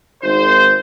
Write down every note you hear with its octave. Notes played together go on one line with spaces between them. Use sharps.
G#1 C5